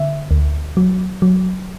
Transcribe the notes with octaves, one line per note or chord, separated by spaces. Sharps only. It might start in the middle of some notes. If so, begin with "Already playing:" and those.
Already playing: D3 E5
D2
F#3
F#3